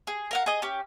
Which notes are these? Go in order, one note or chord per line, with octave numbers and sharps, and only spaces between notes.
G#4
A#4 F5 F#5
G#4 D#5
C#4 G4